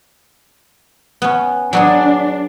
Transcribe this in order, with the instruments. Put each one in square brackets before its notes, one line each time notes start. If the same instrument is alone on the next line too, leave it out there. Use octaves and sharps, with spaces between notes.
[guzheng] B3 C#4
[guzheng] F#3 B3 G#4 [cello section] D4